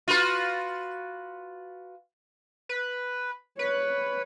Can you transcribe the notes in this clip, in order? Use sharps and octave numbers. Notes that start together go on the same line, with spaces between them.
F4 F#4 B4
B4
B4 C#5